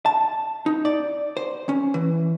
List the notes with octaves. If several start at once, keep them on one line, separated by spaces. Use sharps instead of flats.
A5
D#4
D5
C5
C#4
E3